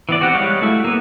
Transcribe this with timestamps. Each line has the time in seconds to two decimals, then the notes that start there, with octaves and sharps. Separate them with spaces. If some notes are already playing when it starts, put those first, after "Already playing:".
0.09 E3 B3 D5
0.20 C4 F#4 G4 F#5
0.35 G3 G#3 C#5 F5
0.62 A3 E4 F#4
0.84 A#3 B3